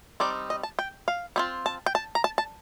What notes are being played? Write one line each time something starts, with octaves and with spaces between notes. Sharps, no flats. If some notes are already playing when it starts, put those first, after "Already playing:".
G3 C4 D#4 D5
D#5
A5
G5
F5
G3 C4 F4
A5
G5
A5
A#5
A5
A5